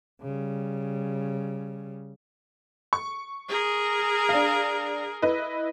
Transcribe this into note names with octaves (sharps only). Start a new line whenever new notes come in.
C#3 G3
C#6
G#4 A#4
D4 F5
E4 B4 D#5